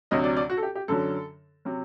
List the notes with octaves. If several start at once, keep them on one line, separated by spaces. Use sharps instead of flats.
D2 C3 F#3 D#5
D5
D5
F#4
A4
G4
G4
F#2 D3 F#3 A4
C3 F#3